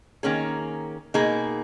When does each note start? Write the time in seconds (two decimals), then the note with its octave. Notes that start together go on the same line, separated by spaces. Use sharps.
0.23 D#3 A#3 C#4 G#4
1.14 B2 A#3 D#4 G#4